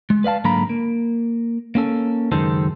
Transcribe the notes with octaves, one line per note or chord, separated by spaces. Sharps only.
G#3
B4 D5 F5 A5
G#2 D3 F#3 A#3 A#5 B5
A#3
A#3 C#4 A4
C#2 F#2 D#3 G#3 A4 C5